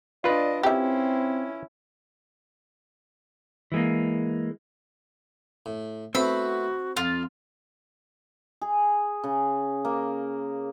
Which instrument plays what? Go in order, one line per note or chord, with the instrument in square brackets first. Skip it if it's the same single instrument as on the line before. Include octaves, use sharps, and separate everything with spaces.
[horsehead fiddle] D4 D#5 [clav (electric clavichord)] F4 B4 [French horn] D5
[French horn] C4 [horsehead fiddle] C#4 E4 [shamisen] G4 E5
[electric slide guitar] E3 G#3 A#3
[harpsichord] A2
[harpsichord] A3 B3 E4 [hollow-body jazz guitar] C4 [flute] F#4 [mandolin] B5
[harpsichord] F2 [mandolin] F4
[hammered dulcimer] G#4
C#3
A#3